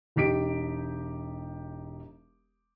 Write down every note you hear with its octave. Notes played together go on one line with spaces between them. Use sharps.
E1 D#4 G4 B6 D7